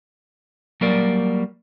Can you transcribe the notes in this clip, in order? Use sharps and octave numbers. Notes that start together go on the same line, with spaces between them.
F#3 G3 A#3 A#4 D5